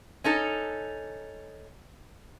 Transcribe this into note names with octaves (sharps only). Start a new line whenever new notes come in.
C#4 D#4 A4